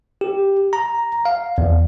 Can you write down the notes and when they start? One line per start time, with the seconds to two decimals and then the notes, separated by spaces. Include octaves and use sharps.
0.21 G4
0.73 A#5
1.25 F5
1.58 E2